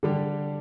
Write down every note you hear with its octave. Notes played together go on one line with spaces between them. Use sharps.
D3 G3 D4 G4